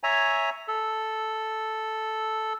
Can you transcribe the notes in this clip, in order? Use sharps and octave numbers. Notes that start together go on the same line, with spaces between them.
C#5 E5 G#5 A#5
A4